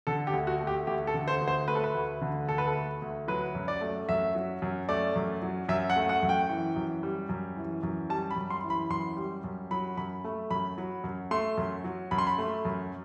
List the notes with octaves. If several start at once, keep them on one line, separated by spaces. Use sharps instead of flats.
D3 A4
G4
D2
F#4
A3
G4
D2 G4
A4
D3
C5
D2
C5
A3 B4
A4
B4
D2
D3
D2 A4
B4
A4
A3
D2
F#3 B4
F#2
D5
A3
F#2 E5
F#3
F#2
A3 D5
F#2
F#3
F#2 E5
F#5
A3
F#5
F#2
G5
E3
F#2
G3
F#2
E3
F#2
G3 A5
B5
F#2
C6
E3
B5
F#2 C6
G3
F#2
F#3 B5
F#2 B5
A3
F#2 B5
F#3
F#2
A3 C6
F#2
F#3
F#2 B5
C6
B5
A3
F#2